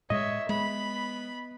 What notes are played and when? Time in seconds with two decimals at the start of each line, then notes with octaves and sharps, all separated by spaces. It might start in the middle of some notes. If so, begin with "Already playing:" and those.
0.10 A2 G#3 C#5 D#5 E5
0.49 G#3 B3 B5